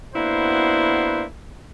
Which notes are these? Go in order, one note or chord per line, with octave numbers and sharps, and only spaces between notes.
A#3 B3 D4 E4 F#4 C5